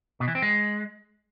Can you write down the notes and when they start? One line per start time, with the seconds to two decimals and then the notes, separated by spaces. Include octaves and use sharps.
0.20 B2
0.28 E3
0.35 C4
0.42 G#3